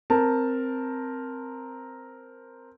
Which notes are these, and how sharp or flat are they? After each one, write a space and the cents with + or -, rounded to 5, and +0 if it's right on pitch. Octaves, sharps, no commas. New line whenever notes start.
C4 +0 A#4 +0 A5 +5